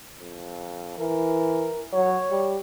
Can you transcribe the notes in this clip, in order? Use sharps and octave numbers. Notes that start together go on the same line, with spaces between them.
F2
E3 A#4
F#3 C#5
G3